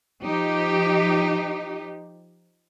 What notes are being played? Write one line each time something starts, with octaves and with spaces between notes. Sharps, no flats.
F3 D#4 G4